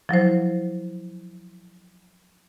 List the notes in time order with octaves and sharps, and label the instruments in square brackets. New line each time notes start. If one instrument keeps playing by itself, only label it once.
[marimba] F3 F#3 E4 C5